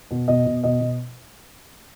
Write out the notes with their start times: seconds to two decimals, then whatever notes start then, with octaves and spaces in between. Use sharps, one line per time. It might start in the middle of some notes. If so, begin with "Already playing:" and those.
0.11 B2
0.28 B2 D#5
0.46 B2
0.64 B2 D#5
0.80 B2